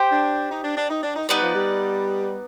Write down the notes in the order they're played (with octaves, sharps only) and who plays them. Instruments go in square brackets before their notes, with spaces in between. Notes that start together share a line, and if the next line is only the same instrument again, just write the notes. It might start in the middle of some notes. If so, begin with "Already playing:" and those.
Already playing: [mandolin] G4 C5 G5
[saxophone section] D4
D#4
D4
D4
D#4
D4
D#4
[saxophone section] G3 [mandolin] B3 D#4 B4 D5
[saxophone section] F3
G3